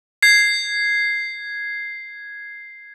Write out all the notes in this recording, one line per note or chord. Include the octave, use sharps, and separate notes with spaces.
G#6 C7